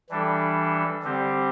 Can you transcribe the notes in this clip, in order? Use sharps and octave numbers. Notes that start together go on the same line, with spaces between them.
E3 G3 D4 A4
D3 G3 C4 G4 C5